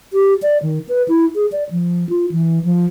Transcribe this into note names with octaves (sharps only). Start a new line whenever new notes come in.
G4
D5
D#3
B4
E4
G#4
D5
F3
F4
E3
F3